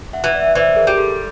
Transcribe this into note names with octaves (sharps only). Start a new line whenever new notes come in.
E5 F#5
E3
D5 E5
E3 C5 D5
G#4 A#4
G3
G4 A4